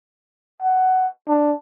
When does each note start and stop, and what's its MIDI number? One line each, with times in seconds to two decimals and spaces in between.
0.62 1.08 78
1.28 1.53 62